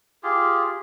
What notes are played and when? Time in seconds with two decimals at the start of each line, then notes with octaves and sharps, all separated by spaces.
0.23 F4 G4 G#4